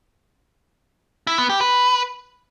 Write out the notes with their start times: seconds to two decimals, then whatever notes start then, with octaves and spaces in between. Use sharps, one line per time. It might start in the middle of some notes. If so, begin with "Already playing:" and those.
1.27 E4
1.38 B3
1.49 G4
1.61 B4